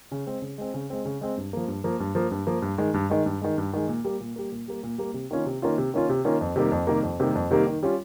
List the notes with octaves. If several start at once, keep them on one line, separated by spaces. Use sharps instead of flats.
C#3
G#3 C4
C#3
G#3 C4
C#3
G#3 C4
C#3
G#3 C4
G2
F3 A#3
G2
F3 A#3
G2
F3 A#3
G2
F3 A#3
G2
D#3 G#3
G2
D#3 G#3
G2
D#3 G#3
G2
D#3 G#3
A#2
G3 A#3
A#2
G3 A#3
A#2
G3 A#3
A#2
G3 A#3
C3
D#3 A#3 C#4 F4
C3
D#3 A#3 C#4 F4
C3
D#3 A#3 C#4 F4
C3
D#3 A#3 C#4 F4
F2
C3 D#3 G3 A#3
F2
C3 D#3 G3 A#3
F2
C3 D#3 G3 A#3
F2
C3 D#3 G3 A#3
D#3
G3 C#4 F4